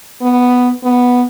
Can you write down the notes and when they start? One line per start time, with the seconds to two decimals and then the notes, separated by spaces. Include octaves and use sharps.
0.22 B3
0.84 B3